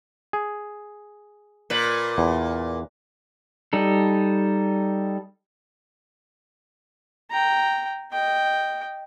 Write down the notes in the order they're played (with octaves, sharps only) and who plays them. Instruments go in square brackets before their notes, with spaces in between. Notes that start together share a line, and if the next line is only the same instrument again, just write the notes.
[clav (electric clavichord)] G#4
[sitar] A#2 B4
[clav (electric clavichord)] E2
[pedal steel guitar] G3 D#4 A4
[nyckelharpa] G5 A#5
D#5 G5